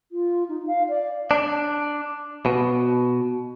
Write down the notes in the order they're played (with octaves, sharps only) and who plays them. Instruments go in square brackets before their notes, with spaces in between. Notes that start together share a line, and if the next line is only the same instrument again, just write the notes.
[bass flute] F4
D#4
F5
D5
[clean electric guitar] D4
B2